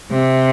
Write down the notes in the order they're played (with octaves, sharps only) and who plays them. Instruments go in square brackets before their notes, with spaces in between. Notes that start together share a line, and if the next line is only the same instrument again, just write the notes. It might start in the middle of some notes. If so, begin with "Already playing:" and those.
[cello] C3